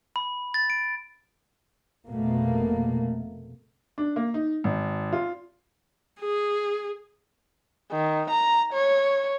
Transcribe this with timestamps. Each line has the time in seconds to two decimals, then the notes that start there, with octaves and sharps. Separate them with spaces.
0.16 B5
0.54 A6
0.70 D7
2.09 F1 B2 A3 A#3
3.98 D4
4.16 A#3
4.34 D#4
4.64 G#1
5.12 F4
6.20 G#4
7.92 D#3
8.30 A#5
8.73 C#5